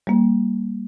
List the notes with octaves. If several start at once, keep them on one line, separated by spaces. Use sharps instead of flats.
G3 A#3